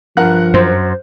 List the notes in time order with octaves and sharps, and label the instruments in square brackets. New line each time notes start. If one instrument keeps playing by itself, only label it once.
[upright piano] G2 A#4 F#5 [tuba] F3 [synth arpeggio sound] F#6
[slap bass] F#2 [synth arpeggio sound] C5